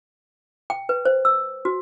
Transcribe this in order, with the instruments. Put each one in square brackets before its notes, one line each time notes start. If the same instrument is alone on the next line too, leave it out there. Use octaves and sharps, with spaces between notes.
[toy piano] G5
B4
C5
E6
F#4